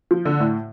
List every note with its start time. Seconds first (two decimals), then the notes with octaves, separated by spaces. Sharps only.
0.11 F3
0.25 D3
0.40 A2